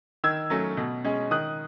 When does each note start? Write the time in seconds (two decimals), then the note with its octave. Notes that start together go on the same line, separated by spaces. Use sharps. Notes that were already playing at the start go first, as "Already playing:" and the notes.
0.24 D#3 E6 G#6
0.50 F#3 A3 C#4
0.77 B2
1.04 G#3 C#4
1.31 D#3 D#6 F#6